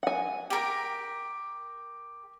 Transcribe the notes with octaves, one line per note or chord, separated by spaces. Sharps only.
F#5 G#5
G4 A#4